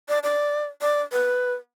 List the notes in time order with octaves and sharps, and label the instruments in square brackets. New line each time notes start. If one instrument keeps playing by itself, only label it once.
[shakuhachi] D5
D5
D5
B4